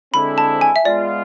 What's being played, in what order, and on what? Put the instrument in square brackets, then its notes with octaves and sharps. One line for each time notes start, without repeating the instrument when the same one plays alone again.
[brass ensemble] D3 G#3 C4 E4 [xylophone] B5
[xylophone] A5
G#5
E5
[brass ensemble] G#3 B3 F4 [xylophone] D5